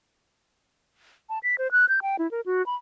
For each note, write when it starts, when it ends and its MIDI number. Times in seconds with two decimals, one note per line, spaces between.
1.29 1.39 81
1.43 1.55 95
1.58 1.71 72
1.72 1.86 90
1.89 2.00 91
2.02 2.16 79
2.19 2.29 64
2.31 2.41 70
2.46 2.65 66
2.66 2.75 83